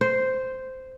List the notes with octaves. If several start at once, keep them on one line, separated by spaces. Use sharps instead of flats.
C5